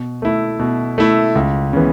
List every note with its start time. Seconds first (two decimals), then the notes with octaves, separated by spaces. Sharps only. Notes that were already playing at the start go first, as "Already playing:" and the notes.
Already playing: B2
0.22 A3 E4
0.59 B2
0.98 A3 E4
1.35 C#2
1.73 C#3 E3 B3